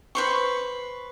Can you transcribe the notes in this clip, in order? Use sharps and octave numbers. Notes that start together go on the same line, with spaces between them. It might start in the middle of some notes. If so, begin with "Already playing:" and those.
B4 C5 C#6